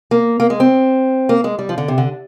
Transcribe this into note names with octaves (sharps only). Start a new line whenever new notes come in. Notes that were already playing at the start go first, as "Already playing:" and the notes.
A#3
A#3
G#3
C4
A#3
G#3
G3
F3
D3
C3
D3